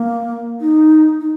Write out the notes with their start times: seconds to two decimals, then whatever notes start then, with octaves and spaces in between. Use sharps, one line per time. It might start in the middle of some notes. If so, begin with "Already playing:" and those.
Already playing: A#3
0.61 D#4
1.21 D#4